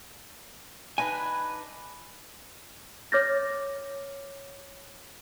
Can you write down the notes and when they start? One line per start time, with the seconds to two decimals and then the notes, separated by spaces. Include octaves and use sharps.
0.98 D4 D#4 B4 G#5
3.12 C#5 D6 F6 G6 A6 A#6